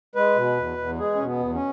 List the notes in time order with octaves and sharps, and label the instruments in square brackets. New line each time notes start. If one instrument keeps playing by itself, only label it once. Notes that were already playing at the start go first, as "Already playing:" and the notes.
[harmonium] G#3 B4
B2
E2
E2
G#3 G#4
B2 C#4
B3
E2
C#4